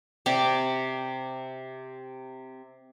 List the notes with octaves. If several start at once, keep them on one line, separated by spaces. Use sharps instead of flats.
C3 G4 D5